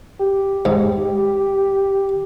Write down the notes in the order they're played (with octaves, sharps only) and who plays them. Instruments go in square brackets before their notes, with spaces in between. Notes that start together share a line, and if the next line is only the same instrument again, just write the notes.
[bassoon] G4
[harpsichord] G#2